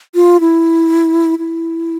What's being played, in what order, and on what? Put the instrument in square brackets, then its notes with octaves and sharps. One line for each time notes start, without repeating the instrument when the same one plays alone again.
[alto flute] F4
E4
E4